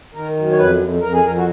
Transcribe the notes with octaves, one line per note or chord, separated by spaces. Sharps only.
D#3 A#4
F#2
C#5
F2 B4
F2
F2 A#4
G#4
F2 A#4
F#4